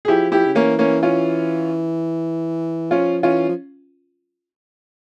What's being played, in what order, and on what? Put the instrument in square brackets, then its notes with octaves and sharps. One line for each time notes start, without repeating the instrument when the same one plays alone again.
[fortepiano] G#4
[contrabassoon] F3 [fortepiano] E4 G4
[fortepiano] E4 G4
[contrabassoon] C#3
[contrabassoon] E3 [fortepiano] A#3 C#4
[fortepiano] A#3 C#4
C#4 F4
[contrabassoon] F3 [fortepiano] C#4 F4
[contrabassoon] E3 [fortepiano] C#4 F4
[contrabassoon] F3